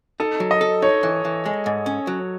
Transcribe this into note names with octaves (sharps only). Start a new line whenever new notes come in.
D#4 A4
F#3
D#5
A4
D#4 C#5
E3
E3
G#3
G#2
C#4
F#3